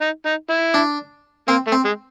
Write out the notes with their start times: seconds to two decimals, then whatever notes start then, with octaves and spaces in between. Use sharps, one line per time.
0.01 D#4
0.26 D#4
0.49 E4
0.74 D4
1.48 A#3 C4
1.67 A3
1.72 C4
1.85 G#3